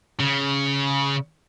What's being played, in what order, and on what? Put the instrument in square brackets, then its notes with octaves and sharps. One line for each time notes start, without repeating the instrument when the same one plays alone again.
[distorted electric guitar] C#3